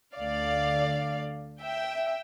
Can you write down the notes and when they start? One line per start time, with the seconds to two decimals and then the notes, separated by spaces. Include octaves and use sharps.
0.15 D2 D3 A3 D5 F5
1.61 E5 G5